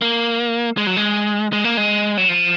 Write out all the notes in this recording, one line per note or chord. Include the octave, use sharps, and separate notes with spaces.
A#3
G#3
F#3
G#3
G#3
A#3
G#3
F#3
F3